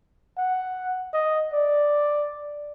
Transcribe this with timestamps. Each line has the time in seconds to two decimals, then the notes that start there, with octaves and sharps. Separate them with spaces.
0.37 F#5
1.14 D#5
1.53 D5